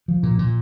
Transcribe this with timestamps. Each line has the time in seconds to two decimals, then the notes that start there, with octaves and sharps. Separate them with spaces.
0.08 F3
0.23 A#2
0.39 A#2